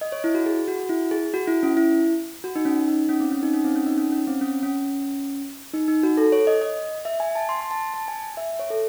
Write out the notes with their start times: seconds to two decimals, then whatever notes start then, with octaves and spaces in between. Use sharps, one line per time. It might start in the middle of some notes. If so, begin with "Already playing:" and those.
0.01 D#5
0.12 C#5
0.24 E4
0.35 F#4
0.46 G#4
0.68 F#4
0.79 F#4
0.89 E4
1.11 G#4
1.34 F#4
1.48 E4
1.63 C#4
1.77 E4
2.44 F#4
2.56 D#4
2.65 C#4
2.88 D#4
3.09 C#4
3.20 C4
3.32 C#4
3.43 D#4
3.54 C#4
3.64 C4
3.76 C#4
3.86 D#4
3.98 C#4
4.12 C#4
4.27 C4
4.41 C#4
4.63 C#4
5.73 D#4
5.88 D#4
6.03 F#4
6.17 A4
6.32 C#5
6.47 D#5
6.61 D#5
7.05 E5
7.20 G#5
7.35 A5
7.49 C6
7.61 C6
7.71 A5
7.94 A5
8.08 G#5
8.37 E5
8.59 C#5
8.70 A4